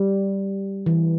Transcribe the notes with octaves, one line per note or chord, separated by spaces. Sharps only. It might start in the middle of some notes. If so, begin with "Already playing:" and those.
Already playing: G3
E3